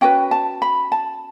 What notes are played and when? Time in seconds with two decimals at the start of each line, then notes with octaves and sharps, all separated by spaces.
0.01 C#4 F#4 B4 G5
0.31 A5
0.62 B5
0.92 A5